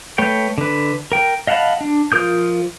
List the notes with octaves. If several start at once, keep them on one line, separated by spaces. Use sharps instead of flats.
A3 B4 C#5 G5
D3 B4
A#4 G5
D#5 F5 F#5 A5 B5
D4
F3 F4 A#4 D#6 G6